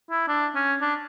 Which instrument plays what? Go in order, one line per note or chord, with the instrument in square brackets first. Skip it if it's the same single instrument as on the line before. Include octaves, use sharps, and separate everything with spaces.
[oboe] E4
D4
C#4
D4